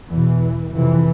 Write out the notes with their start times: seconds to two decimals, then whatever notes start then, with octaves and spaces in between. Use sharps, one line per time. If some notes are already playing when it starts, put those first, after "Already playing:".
0.10 E2 B2 E3
0.73 F2 C3 E3